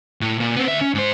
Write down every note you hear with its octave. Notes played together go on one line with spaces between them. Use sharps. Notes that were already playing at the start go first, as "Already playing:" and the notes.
A2
A#2
B3 C4
D2 E5
C#4
G#2 C5